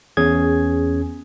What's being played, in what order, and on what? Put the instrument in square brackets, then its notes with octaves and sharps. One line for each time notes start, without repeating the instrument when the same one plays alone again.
[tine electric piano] E2 C#4 G#4 G#6